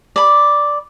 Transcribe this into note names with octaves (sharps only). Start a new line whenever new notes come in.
D5 B5